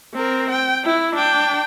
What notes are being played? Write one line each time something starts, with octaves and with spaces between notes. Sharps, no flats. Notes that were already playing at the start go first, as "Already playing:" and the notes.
C4 A#4
G5
E4
D4 G5